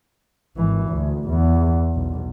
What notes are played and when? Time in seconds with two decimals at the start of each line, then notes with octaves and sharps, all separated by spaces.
0.56 G#1 E3
0.90 D2
1.28 E2
1.95 B1